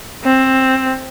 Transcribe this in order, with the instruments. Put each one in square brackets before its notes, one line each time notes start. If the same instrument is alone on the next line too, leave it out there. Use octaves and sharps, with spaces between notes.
[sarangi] C4